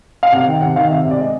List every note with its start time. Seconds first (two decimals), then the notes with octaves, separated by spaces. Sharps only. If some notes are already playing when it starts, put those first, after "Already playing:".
0.23 F5
0.32 C3 F#5
0.46 D#3 G5
0.61 C3 F#5
0.76 D#3 F5
0.90 C3 E5
1.05 C3
1.11 D5
1.19 G#3 D#5